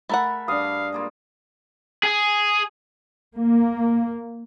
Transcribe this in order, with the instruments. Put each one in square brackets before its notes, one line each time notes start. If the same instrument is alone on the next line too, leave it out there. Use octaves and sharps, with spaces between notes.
[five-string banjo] A3 A#4 F#5 [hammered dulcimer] E5 A5 B5
[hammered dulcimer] G2 [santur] D4 D#6 [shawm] F5
[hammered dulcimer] G#3 A#3 F4
[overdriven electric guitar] G#4
[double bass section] A#3